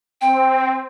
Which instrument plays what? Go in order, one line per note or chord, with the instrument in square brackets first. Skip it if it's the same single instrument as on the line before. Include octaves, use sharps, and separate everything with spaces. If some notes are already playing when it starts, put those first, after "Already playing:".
[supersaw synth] C4 [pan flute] G5